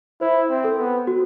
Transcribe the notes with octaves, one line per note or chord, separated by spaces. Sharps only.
E4 C5
C4
A4
B3
F#4